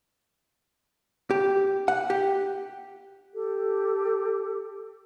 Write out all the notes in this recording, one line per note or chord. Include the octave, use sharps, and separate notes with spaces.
G4
F#5
G4
G4 A4